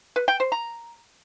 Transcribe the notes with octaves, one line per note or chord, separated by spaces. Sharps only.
B4
G5
C5
A#5